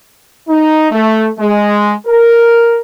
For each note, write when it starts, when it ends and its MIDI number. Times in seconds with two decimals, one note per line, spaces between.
0.49 0.90 63
0.92 1.29 57
1.39 1.92 56
2.07 2.80 70